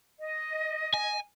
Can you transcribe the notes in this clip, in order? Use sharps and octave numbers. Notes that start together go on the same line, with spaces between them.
D#5
G#5